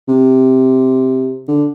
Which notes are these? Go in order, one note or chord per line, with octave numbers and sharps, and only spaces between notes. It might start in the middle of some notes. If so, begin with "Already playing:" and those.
C3
D3